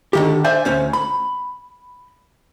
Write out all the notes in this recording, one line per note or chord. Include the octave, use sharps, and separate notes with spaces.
D3 D#3 G4
C5 D5 E5 G#5
D2 C#4 C5
B5